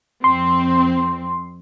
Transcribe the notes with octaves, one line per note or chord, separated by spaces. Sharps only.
F2 C4 C6